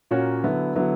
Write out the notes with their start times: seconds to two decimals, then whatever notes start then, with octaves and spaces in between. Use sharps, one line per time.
0.11 A#2 A#3 C#4 F#4 C#5
0.43 D3 F#3 B3 E4
0.75 D3 F#3 B3 E4